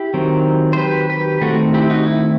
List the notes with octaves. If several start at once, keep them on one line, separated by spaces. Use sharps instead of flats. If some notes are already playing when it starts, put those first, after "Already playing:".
Already playing: E4 G4
D#3 F#3 C4
C5
G4 B4
G4 B4
D#3 A3 C4 F#4 A4
E4 G4
D#4 F#4
E4